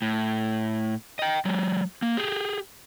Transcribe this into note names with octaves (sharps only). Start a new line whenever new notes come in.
A2
D#5 G5
F#3 G#3
A#3
G4 G#4